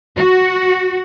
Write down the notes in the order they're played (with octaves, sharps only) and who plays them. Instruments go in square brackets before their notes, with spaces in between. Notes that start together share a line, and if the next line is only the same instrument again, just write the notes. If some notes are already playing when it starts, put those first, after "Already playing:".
[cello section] F#4